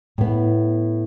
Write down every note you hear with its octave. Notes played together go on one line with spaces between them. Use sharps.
A2 B3